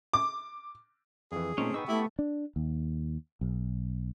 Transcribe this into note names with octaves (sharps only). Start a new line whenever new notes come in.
D6
F2 E3 G#4
A#2 A3 C4 C#4 D#4 A#5
B3 D#4 B4 G5 C#6 E6
A3 E4 G4
D4
D#2
B1